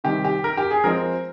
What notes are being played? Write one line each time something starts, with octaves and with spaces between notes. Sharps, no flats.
C3 D#3 G3 G4
G4
A#4
G4
G#4
F3 G#3 C4 A#4